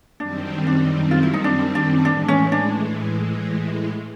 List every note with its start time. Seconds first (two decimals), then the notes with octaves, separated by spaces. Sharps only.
0.20 F#2 D#3 G3 C4 D4
0.67 D4
1.11 F4
1.23 E4
1.34 D#4
1.44 D4
1.75 D4
2.05 A2 E3 G#3 D4
2.28 C#4
2.52 D4